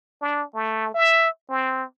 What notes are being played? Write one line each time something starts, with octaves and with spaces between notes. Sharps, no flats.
D4
A3
E5
C4